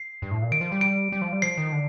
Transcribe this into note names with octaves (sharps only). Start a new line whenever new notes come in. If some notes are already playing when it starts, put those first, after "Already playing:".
Already playing: C7
G2
A2
A#2
D#3 D7
F3
G3
D7
G3
F3
G3
F3 C7
D#3
D3